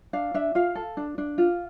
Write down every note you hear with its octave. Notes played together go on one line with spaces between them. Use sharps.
D4 F5
D4 E5
F4 F5
A4
D4
D4
F4